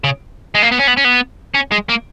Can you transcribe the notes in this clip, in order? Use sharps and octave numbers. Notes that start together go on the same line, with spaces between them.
C#3
G#3
A#3
B3
C#4
B3
C#4
B3
C#4
G#3
A#3